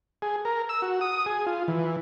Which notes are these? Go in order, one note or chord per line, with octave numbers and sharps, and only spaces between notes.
G#4
A#4
E6
F#4
D#6
G#4
F4
E3